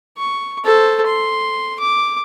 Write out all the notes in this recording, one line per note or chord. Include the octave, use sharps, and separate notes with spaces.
C#6
A4 C5
C6
D6